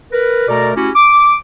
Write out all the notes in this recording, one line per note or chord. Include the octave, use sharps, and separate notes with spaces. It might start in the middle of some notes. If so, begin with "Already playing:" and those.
A#4 B4
B2 A3 A4 A#4 D5 A#5
A3 C#4 E4 F#4 G4
D6